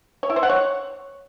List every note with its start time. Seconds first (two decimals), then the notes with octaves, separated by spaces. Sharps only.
0.23 C#5
0.30 E4
0.36 C5
0.43 F#5
0.49 C#5